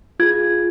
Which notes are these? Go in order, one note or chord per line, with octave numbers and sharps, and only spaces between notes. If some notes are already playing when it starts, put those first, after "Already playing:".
F4 G#4 G#6